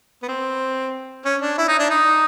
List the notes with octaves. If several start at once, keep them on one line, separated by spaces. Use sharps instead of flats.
B3
C4
C#4
D4
E4
D#4
D4
D#4